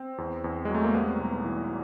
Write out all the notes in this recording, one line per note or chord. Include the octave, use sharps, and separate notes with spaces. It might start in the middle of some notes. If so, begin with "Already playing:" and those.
Already playing: C4
E2
E2
F#3 G#3
A3
A#3
G3 B3
B1
E3